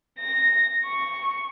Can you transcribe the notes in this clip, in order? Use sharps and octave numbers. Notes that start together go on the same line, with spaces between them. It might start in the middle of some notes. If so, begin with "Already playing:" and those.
A#6
C#6